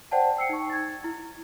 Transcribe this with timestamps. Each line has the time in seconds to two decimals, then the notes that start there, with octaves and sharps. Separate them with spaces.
0.11 C5 D5 F#5 G5 A5
0.37 G5 E6 C7 C#7
0.49 D#4 C#6
0.70 G#6 A6
1.04 E4